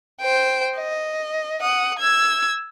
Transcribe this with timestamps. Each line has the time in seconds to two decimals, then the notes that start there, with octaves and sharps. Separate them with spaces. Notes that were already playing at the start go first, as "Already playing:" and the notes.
0.21 C5 G5
0.77 D#5
1.62 F#5 D#6
1.99 E6 G#6